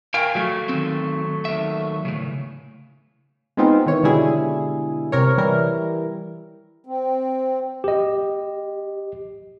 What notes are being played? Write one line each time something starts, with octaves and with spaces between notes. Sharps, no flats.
A#4 F5 G5 G#5
F#3 A3
D#3 C4
D#2 E5
A2 C#3
G#3 B3 C4 D#4 F4
D#3 E3 C#5
B2 D3 G3 G#3 E4 G#4
C3 A#4 C#5
E3 G3 E4 A#4
C4
G4 D#5